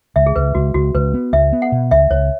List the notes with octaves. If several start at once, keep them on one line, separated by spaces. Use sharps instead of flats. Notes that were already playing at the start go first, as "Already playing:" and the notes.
C#2 E5
G#4
C#2 B4
C#2 F#4
C#2 F#4
C#2 B4
B3
C#2 E5
B3
F#5
B2
C#2 E5
C#2 C#5